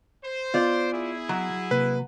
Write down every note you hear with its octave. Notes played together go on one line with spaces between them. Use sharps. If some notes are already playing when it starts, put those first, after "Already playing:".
C5
B3 F4 D5 G6
E4 G#4
F#3
C3 A#3 B4